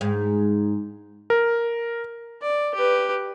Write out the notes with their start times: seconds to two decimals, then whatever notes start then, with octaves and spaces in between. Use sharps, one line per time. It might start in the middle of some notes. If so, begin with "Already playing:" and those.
0.01 G#2
1.30 A#4
2.42 D5
2.74 G4 B4